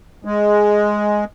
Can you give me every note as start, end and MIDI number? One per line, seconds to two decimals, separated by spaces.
0.25 1.24 56